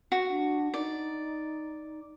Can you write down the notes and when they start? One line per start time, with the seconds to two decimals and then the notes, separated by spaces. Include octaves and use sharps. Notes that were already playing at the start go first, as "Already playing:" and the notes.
0.12 F#4
0.30 D4
0.74 D#4 D5